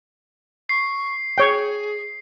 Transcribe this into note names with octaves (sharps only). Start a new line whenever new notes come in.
C#6 C7
G#4 C#5 G5